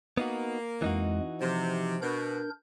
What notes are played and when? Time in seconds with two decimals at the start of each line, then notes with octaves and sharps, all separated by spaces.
0.17 A#3 B3 D#4 F#4
0.82 F2 E3 G#3 D#4 F#4
1.41 C3 F3
2.02 B2 D4 A#4 G6